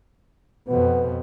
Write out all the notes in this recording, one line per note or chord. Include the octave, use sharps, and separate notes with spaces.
F2 B2 B3